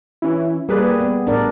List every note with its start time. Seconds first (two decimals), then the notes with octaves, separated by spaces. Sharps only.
0.22 E3 C#4 E4
0.69 G3 A#3 G#4 B4 D5
1.01 B3
1.27 A1 D4 A#4 D5